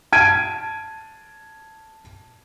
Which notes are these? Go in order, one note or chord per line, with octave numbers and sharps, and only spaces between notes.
A5 G#6 D7 D#7